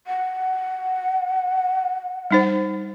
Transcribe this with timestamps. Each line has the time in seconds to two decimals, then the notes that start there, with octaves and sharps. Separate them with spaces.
0.07 F#5
2.31 G3 D#4 C5